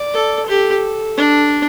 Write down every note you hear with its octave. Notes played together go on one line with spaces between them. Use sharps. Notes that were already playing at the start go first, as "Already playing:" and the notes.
Already playing: D5
A4
G4 A4
D4